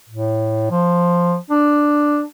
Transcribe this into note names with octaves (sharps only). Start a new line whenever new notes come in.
A2
F3
D4